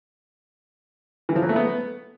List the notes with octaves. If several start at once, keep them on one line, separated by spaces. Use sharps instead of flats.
E3
F3
F#3
A3
B3